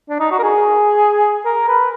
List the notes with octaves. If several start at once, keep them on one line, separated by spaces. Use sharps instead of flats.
D4
D#4
F#4
A#4
G#4
A#4
B4